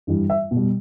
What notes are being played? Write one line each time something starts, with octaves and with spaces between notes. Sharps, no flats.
G2 E3 G3
E5
B2
G3